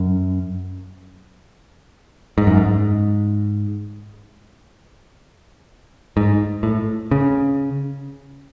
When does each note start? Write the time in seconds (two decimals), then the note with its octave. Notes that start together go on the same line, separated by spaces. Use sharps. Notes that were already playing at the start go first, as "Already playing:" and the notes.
Already playing: F#2
2.38 G#2
2.47 F#2
2.57 G#2
6.17 G#2
6.63 A2
7.11 C#3